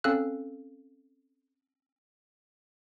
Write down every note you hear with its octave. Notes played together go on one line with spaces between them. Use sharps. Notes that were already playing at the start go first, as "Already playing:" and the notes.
C4 C#4 A4 F5 E6 F#6